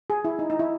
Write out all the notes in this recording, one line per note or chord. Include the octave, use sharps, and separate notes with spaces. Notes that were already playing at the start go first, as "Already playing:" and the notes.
G#4
E4
D#4
D#4
E4